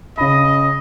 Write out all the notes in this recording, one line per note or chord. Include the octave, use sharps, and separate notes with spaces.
C#3 D#5 B5